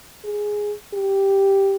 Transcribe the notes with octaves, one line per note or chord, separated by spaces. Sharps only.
G#4
G4